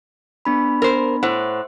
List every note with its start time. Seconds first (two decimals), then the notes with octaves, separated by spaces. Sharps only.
0.45 B3 D4 B5
0.82 A#4 C5
1.23 A2 C5 F#5 F#6